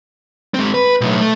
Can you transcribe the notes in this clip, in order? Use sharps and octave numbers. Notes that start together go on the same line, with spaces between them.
G#3 C4
B4
B1 A2
A3